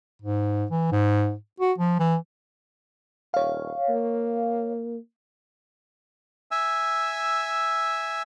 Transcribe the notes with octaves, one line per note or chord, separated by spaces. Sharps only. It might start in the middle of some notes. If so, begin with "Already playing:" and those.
G#2
E3
G#2
F#4
F3
E3
D#1 C#5 F5
A#3
E5 G#5 E6